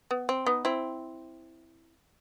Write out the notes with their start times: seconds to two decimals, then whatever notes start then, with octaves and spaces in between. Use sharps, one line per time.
0.11 B3
0.29 C4
0.46 B3 D#4
0.65 C4 E4